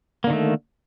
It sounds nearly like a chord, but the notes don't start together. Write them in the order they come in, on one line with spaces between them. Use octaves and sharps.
A#3 D3 D#3 A3